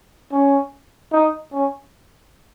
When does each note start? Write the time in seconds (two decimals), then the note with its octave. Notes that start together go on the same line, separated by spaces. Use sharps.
0.32 C#4
1.12 D#4
1.53 C#4